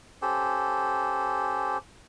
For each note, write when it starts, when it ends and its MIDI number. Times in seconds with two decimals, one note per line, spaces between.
0.22 1.78 61
0.22 1.78 67
0.22 1.78 69
0.22 1.78 72